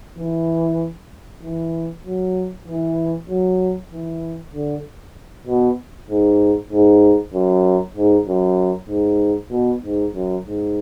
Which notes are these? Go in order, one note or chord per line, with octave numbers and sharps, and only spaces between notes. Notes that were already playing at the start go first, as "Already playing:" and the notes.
E3
E3
F#3
E3
F#3
E3
D3
B2
G#2
G#2
F#2
G#2
F#2
G#2
B2
G#2
F#2
G#2